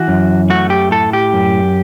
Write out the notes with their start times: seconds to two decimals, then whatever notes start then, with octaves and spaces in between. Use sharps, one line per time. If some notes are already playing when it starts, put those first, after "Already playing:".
Already playing: E3 F#4
0.08 F#2
0.50 A3 F#4
0.70 G4
0.91 A2 A4
1.13 G4
1.33 F#2